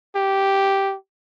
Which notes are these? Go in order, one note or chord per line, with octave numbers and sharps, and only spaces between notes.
G4